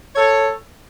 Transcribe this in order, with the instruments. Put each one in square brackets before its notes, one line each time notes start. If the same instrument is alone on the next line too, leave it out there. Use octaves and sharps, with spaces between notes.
[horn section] A4 C#5